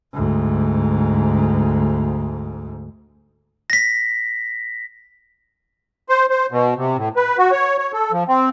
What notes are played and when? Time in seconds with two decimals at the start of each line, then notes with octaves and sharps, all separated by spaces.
0.13 D2 G#2
3.70 A#6 B6
6.09 C5
6.30 C5
6.51 B2
6.77 C3
6.97 A2
7.16 B4
7.38 F#4
7.52 C#5
7.78 C#5
7.93 A4
8.12 F3
8.28 C4